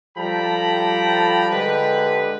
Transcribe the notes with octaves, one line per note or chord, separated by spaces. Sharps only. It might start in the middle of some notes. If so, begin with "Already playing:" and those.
F3 G3 A4 G5 A#5 B5
D3 G#3 G4 B4